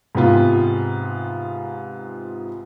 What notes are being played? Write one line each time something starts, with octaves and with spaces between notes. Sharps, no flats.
G#2 C3 B3 F4